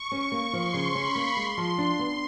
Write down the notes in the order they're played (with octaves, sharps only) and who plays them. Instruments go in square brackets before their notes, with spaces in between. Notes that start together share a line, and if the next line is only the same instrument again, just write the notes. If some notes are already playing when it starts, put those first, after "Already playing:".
Already playing: [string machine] C#6
[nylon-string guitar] C#4
A#3
[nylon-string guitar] F3 [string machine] C6
[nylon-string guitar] C#3
[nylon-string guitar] C#4 [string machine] B5
[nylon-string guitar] A#3
[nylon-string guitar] G#3 [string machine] C6
[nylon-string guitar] F3
D4
B3